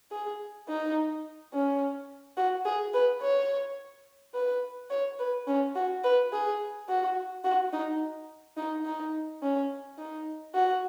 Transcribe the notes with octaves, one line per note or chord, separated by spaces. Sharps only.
G#4
D#4
C#4
F#4
G#4
B4
C#5
B4
C#5
B4
C#4
F#4
B4
G#4
F#4
F#4
D#4
D#4
D#4
C#4
D#4
F#4